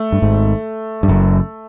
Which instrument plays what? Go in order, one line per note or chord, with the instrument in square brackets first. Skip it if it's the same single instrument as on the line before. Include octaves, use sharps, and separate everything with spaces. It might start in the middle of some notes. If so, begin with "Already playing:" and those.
Already playing: [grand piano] A3
[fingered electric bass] G2
G#1 G#2
G2
F#1 F#2